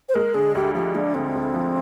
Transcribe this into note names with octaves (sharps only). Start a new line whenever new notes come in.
C5
G#3 A#4
D3 G#4
D2 G4
F3 G4
G#3 D4
D3 C4
D2
F3